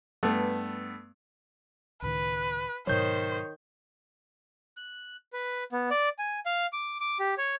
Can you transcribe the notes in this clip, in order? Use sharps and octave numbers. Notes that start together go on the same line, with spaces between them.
G2 A3 B3
C#2 A2 D#3 B4
G#2 B2 D#3 F#3 C5 C#5 G6
F#6
B4
B3
D5
G#5
F5
D6
D6
G4
C#5